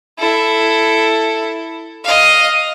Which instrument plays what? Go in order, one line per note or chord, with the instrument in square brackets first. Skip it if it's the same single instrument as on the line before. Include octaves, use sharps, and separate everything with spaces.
[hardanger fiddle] E4 A4
D#5 F5